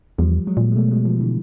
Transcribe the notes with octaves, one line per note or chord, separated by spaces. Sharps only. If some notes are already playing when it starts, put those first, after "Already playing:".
E2 F3 G3
F#3 G#3
A#2
G#3
B2 G3 A3
F#3 G#3
F3 G3
D3 E3